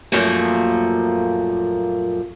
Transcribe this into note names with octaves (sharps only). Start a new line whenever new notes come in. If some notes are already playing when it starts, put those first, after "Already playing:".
F#2 A#2 F3 A3 A#3